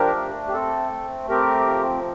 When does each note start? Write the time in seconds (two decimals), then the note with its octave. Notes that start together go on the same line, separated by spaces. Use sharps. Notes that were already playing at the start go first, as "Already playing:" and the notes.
Already playing: F3 D4 G4 A#4
0.16 A3
0.48 G4
0.53 C4 A4
0.92 A3
1.29 C4 G4 A#4
1.67 F3